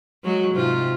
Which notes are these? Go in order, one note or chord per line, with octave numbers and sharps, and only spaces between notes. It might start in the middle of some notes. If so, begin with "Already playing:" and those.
F#3 G#3 F#4
G#2 C3 F4